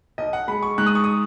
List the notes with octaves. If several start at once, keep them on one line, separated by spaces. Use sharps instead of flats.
B1 D#5
F#5
G#3 B5
C#6
G#2 F#6
D#6
C#6
D#6